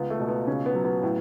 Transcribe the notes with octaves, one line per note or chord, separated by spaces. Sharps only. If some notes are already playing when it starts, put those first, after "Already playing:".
Already playing: C#2 B3
A3
B2
B3
C#3 C#4
B3
F#3
B3
A2